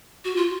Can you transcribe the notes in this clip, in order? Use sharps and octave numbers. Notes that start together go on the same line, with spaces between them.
F#4
F4